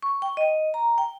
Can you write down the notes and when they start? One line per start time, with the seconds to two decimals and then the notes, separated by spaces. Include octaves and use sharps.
0.03 C#6
0.22 G5
0.37 D#5
0.74 A#5
0.98 G5